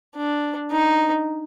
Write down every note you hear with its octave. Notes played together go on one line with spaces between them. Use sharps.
D4
D#4